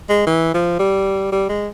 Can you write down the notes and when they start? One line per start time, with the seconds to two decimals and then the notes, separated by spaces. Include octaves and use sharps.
0.09 G#3
0.27 E3
0.54 F3
0.79 G3
1.32 G3
1.49 G#3